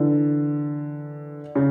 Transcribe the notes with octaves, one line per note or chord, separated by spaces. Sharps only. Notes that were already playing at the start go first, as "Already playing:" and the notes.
Already playing: D3 E3
C#3